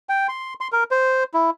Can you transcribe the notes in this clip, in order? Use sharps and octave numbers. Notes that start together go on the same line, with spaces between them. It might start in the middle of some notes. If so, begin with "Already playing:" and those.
G5
C6
C6
A#4
C5
E4